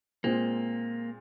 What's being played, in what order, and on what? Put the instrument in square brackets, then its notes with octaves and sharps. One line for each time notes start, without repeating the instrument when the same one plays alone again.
[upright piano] A#2 G#3 C4 [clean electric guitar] A#3